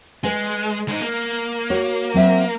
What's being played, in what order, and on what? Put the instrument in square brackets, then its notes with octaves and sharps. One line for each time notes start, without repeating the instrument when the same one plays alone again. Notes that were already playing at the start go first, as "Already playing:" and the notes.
[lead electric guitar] G#3 [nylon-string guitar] B4 G#5
[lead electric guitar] G#3 D#4
A#3
[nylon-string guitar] F#4 C#5
F#3 C4 E5